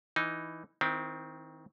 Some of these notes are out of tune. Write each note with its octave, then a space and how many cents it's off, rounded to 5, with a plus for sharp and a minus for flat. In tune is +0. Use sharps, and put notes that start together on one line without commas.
E3 +0 D#4 +0
D#3 +25 C4 -5 E4 +5